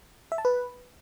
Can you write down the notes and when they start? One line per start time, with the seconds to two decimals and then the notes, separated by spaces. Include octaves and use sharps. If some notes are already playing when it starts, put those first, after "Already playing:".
0.32 E5
0.38 A5
0.45 B4